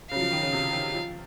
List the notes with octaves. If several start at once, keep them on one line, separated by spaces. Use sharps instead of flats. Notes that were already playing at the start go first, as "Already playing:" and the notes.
C#3 F#3 F5
F3
D#3
C#3
C3
D#3
F3